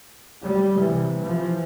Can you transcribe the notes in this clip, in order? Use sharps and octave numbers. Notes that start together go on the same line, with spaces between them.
G3
C3 E3
E3 F3